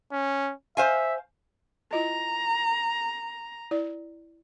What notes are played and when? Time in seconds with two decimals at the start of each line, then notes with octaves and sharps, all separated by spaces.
0.12 C#4
0.77 C5 E5 F5 G#5
1.93 E4 F4 D#5 A#5
3.71 E4 D5